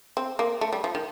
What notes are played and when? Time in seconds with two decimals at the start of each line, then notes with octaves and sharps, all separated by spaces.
0.17 C4
0.39 A#3
0.61 A3
0.73 G3
0.84 F3
0.95 D#3